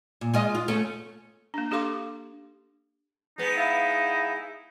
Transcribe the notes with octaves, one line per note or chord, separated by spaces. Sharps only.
A#2
G#3 F4 D#5
F4
A3 C#4
A#3 D4
D4 G4 A4 F5 C6 D6
G#3 B3 D#4
E4 F5